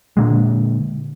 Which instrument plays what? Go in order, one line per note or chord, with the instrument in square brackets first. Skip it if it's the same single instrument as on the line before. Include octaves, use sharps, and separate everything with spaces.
[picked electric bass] A#2 D3 G#3